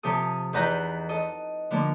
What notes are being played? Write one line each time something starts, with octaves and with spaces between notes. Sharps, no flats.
C3 F3 A4 D#6
E2 D#4 B4 F#5 A#5 G6
A4 D#5
D3 F3 A#3